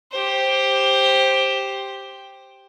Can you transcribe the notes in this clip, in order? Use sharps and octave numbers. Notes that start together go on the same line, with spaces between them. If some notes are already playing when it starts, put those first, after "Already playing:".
G4 C5